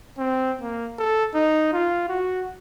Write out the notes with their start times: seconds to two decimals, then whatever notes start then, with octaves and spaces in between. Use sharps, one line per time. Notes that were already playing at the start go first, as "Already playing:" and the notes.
0.18 C4
0.62 A#3
0.99 A4
1.34 D#4
1.73 F4
2.08 F#4